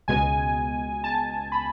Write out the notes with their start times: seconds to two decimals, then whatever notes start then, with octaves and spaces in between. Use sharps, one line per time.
0.08 C#2 B2 G#3 G#5
1.04 A5
1.52 B5